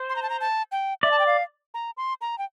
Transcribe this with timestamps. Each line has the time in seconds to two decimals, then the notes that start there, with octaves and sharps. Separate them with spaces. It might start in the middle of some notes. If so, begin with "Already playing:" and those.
Already playing: C5
0.09 C6
0.16 A#5
0.23 A5
0.30 A#5
0.41 A5
0.72 G5
1.03 D5 E5
1.11 A5
1.19 G5
1.26 F5
1.74 A#5
1.97 C6
2.21 A#5
2.38 G5